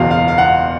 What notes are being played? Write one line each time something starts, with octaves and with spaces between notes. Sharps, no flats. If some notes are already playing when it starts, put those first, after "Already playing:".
Already playing: F#1 E2 B2 F5
F5
F5
F#5